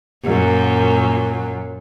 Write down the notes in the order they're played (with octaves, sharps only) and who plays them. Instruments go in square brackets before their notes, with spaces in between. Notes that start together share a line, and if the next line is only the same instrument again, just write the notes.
[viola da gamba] F#2 A#2